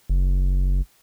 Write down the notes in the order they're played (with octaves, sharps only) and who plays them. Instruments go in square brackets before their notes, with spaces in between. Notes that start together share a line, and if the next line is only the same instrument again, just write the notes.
[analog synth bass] F#1